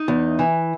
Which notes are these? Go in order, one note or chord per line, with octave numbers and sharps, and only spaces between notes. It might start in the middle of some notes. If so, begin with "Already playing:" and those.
Already playing: D#4
E2
E3